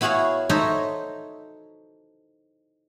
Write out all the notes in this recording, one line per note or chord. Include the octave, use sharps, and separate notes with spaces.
B3 E4 F#4 G#4 C#5 F5
D#4 A4 C5 C#5 D#5 E5